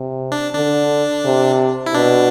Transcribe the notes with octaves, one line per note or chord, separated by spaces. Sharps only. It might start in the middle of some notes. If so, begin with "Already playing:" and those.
Already playing: C3
D4
D3 D4
C3
E4
B2 D4